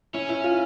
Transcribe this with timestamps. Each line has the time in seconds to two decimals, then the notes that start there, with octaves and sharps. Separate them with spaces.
0.14 C#4 E4
0.29 E4
0.44 F4